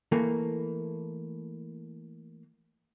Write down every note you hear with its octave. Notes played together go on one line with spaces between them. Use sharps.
E3 A3 A#3